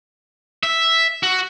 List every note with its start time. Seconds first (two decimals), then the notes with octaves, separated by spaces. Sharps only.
0.63 E5
1.23 F#4